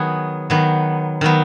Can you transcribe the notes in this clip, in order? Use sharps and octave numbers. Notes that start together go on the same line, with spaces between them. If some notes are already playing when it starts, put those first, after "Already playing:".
Already playing: D#3 F#3 B3 F#4 G#4
D#3 F#3 B3
D#3 F#3 B3